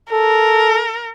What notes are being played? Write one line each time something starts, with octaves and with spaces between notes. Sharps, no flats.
A4 A#4